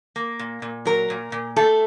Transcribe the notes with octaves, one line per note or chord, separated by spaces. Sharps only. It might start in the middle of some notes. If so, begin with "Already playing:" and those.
A#3
A#2
A#2
F#3 A#4
A#2
A#2
A3 A4